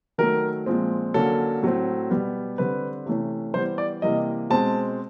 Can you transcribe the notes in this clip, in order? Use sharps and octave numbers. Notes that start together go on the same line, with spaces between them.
D#3 F#3 A3 A#4
A#2 F3 G#3 C4
D3 F#3 A#3 C#4 A4
A2 F#3 A3 C4
B2 G3 B3
D3 G3 C4 B4
C3 E3 A3 C#4
E3 G3 B3 C5
D5
C3 E3 G3 A#3 D#5
B2 G#3 C4 A5